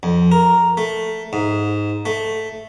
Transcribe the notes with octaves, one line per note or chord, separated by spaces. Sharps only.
F2
A#4
A3
G#2
A3